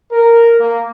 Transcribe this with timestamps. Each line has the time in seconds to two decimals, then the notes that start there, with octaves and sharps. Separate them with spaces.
0.11 A#4
0.60 A#3